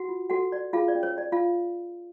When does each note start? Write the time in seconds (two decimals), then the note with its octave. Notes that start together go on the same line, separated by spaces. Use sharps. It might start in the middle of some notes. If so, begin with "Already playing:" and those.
Already playing: F#4 F#5
0.09 F4
0.30 F#4 A4 F#5
0.52 F#4 D5
0.73 F4 G#4 F5
0.88 D5
0.95 C#4
1.03 C#5
1.17 C#5 D5
1.32 F4 F5